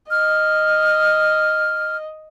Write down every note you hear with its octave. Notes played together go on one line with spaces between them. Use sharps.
D#5 F6